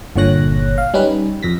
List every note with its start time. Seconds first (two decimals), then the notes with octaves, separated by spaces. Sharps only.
0.16 G1 A#2 D3 C#5 F#6 A#6
0.78 F5
0.94 G3 C#4 D#4 B4
1.43 F2 A#6 B6